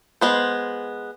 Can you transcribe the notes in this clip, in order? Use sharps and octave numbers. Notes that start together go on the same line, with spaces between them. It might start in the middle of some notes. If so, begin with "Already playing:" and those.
G#3 B3 C5